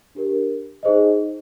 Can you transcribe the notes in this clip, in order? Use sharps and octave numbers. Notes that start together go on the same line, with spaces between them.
D4 G4 A#4
D#4 G#4 C5 D#5